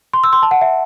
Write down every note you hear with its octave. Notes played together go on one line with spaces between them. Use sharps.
C6
E6
C6
A5
F#5
E5